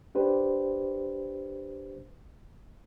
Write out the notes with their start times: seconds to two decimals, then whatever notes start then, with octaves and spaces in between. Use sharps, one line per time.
0.15 D4 G4 B4 C5